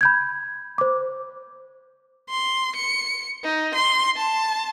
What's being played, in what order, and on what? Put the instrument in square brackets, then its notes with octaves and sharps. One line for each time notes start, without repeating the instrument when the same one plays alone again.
[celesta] B5 G6 G#6
C5 D6
[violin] C6
C#7
D#4
C6
A5